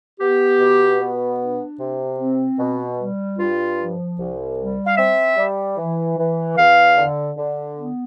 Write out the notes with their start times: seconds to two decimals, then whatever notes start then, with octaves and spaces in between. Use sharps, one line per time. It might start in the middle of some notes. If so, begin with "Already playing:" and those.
0.20 B3 G4
0.60 B2
1.00 B3
1.39 D4
1.80 C3
2.19 C4
2.59 B2
2.98 G3
3.38 G2 F4
3.78 F3
4.18 C2
4.58 G3
4.86 F5
4.97 C4 E5
5.37 G3
5.77 E3
6.18 E3
6.57 E2 F5
6.97 D3
7.37 D3
7.76 B3